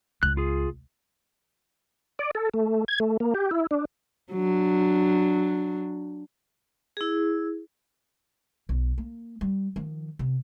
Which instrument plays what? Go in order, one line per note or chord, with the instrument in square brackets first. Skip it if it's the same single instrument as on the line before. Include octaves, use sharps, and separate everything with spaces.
[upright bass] C#2 [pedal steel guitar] F#6
[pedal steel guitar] F4 G#4
[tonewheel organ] D5
A4
A3
G#6
A3
A#3
G4
E4
D4
[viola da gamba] F#3 D4
[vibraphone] E4 G#4
[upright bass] B1
A#3
G3
D#3 F3
C3